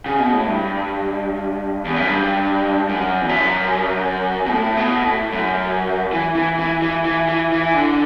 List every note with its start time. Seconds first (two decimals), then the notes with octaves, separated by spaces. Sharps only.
0.06 C#3
0.20 B2
0.33 A2
0.47 G2
1.85 E2
1.96 F#2
2.08 G2
2.89 F#2
3.21 E2
3.29 F#2
4.46 B2
4.51 A2
4.77 B2
5.04 A2
5.32 F#2
6.13 E3
6.36 E3
6.59 E3
6.82 E3
7.05 E3
7.28 E3
7.52 E3
7.74 D3